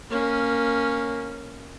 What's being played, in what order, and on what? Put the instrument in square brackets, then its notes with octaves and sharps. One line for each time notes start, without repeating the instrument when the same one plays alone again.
[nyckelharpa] A#3 C#4